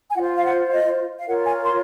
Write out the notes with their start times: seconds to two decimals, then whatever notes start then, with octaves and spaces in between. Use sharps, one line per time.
0.09 G#5
0.16 F4 C5 F#5
0.36 F5
0.44 F#5
0.72 D#5
1.19 F5
1.28 F4 A#4 C#5 F#5
1.47 G#5
1.65 C6